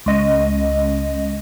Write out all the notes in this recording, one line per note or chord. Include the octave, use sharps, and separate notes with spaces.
C#2 D#5